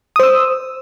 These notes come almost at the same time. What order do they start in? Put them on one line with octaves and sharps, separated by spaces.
D#6 C5 E6